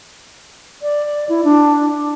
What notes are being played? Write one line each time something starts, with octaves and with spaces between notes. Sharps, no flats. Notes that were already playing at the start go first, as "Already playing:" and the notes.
D5
E4
D4